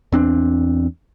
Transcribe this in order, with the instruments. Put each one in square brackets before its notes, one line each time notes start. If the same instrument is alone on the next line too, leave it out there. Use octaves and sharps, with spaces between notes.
[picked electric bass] E2 C4 D4